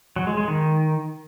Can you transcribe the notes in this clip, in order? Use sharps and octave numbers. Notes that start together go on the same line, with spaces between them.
F#3
G#3
G#3
D#3